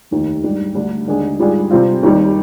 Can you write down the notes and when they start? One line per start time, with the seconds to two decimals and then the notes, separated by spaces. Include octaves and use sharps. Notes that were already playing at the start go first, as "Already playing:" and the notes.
0.11 F1 D#2 D#3
0.44 G#2 G3 D4
0.75 D2 D3 G3 D4
1.07 D#2 D3 G#3 D4 G#4
1.39 G#2 G3 D4 F4 G#4
1.71 C3 G3 C4 F4
2.03 D#2 D#3 G3